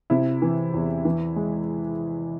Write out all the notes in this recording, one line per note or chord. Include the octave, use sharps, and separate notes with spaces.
C3 E4
E3
E2
E3
G#3